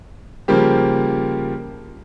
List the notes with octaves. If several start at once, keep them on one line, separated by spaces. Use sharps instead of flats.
C#3 F3 G3 A#3 G4